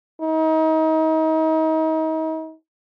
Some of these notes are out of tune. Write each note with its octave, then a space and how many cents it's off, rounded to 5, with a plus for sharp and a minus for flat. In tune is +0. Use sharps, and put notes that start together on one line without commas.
D#4 +35